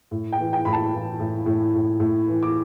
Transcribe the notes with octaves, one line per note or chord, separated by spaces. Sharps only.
A2
G5
E3
G5
A2 B5
A5
E3
A2
A2
A2
A2
E3
D6